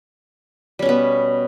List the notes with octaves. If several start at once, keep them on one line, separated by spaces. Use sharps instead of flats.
B2 G3 B3 C#4